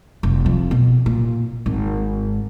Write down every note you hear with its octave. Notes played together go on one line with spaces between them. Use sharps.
F1
F2
B2
A#2
G#1